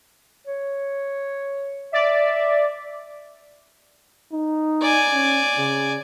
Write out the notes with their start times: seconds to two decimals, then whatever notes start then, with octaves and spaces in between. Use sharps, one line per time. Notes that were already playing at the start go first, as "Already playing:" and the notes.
0.47 C#5
1.93 D5 E5
4.33 D#4
4.82 D5 G#5
5.12 C#4
5.58 C#3